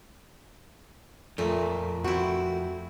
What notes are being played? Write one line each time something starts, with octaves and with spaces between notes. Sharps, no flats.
F2 A#2 A3
C4 E4 F#4